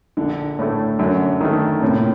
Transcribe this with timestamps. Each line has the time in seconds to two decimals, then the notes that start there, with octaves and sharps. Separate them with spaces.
0.17 A#1 D3
0.59 A2 A3
0.99 F#2 D3
1.41 D#3 A3
1.82 A2 C3
1.95 A#2